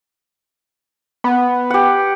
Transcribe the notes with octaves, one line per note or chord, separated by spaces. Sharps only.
B3
G4 F#5